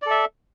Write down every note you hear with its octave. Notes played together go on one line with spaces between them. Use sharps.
A4 D5 E5